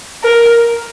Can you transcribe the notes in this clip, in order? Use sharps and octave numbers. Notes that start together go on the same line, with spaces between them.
A#4